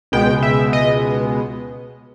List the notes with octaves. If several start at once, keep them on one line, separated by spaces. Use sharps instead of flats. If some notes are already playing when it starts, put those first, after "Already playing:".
C#2 B2 G#3 B3 G5
E5
D#5